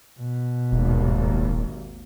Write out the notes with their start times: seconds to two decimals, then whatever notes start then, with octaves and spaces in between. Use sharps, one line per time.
0.21 B2
0.72 D#1 G#1 D#2